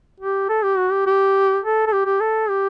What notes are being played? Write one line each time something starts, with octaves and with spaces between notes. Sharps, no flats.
G4
A4
G4
F#4
G4
G4
A4
A4
G4
G4
A4
G4